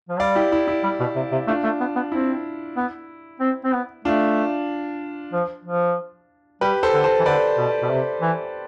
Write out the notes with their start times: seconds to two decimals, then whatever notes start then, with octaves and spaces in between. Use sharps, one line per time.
0.09 F3
0.20 G3 D5 F5
0.35 E4 G4
0.52 E4
0.68 E4
0.84 G3
1.00 B2
1.16 C3
1.32 C3
1.47 A3 D4 F4
1.64 A3
1.80 B3
1.96 B3
2.12 C4 E4
2.77 B3
3.40 C4
3.65 C4
3.73 B3
4.05 A3 D4 F4
5.33 F3
5.65 F3
6.61 G3 G4 B4
6.83 A4 C5
6.94 D3
7.04 A4 C5
7.20 E3
7.25 D3 B4 D5
7.58 B2
7.82 B2
7.90 C3
8.22 E3